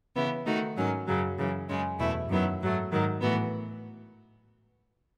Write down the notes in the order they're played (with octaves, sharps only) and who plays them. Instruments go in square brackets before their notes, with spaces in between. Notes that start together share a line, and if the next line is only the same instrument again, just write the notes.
[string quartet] C#3 E3 B3 E4
D#3 A3 D#4 F#4
G#2 D#3 F#3 C#4
F#2 C#3 F#3
F#2 C#3 E3
F#2 C#3 G#3 C#4
E2 B2 A3 E4
F#2 D#3 F#3 B3 E4
G#2 F#3 A3
G#2 D#3 F#3
A2 E3 B3 F#4